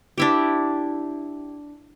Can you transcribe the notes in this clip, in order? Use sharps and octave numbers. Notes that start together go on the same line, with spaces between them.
D4 E4 G4